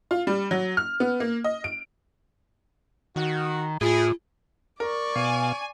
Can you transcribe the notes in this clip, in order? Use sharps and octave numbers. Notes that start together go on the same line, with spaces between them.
F4
G3
F#3
F6
B3
A#3
D#5
D7
D#3 F#4
A2 E4 F4 G#4
A#4 D5 C#6
B2 F5 G#5 C7